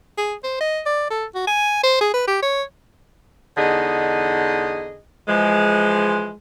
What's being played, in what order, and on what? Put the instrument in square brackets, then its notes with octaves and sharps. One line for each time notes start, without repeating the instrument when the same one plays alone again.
[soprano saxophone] G#4
C5
D#5
D5
A4
F#4
G#5
C5
G#4
B4
G4
C#5
[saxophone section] E2 D3 D#4 G#4 D#5
E3 F3 G#3